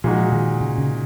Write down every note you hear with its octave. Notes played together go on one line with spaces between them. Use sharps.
A#2 F3 G#3 D#4 F#4
D#3
C#3
C#3